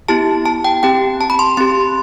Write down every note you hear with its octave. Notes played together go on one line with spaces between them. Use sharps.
B3 E4 G4 A5
A5
G5
C4 G4 G5
A5
B5
C6
C4 G4 C6